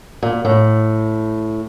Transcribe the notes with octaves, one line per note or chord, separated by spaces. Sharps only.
A#2
A2